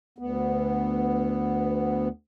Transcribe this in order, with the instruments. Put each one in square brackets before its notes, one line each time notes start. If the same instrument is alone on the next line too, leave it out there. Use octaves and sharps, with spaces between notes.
[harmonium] D2 B3